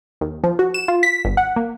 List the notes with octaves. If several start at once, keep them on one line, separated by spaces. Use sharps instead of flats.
D#2
F3
F#4
E7
F4
B6
G1
F#5
A#3